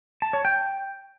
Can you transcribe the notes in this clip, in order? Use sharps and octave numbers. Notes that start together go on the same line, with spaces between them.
A5
C#5
G5